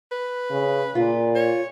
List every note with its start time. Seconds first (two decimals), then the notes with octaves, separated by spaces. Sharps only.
0.12 B4
0.50 C#3
0.95 A#2 F4
1.36 C#5